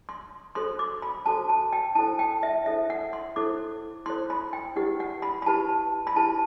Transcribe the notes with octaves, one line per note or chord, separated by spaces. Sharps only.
C6
F#4 A4 C5 C6
D6
B5
F#4 A4 C5 A5
A5
G5
E4 A4 C5 A5
G5
E5
E4 A4 C5 E5
F#5
C6
E4 A4 C5 D6
E4 A4 C5 C6
B5
G5
E4 G4 B4 F#5
F#5
B5
B5
E4 G4 B4 A5
B5
E4 G4 B4 A5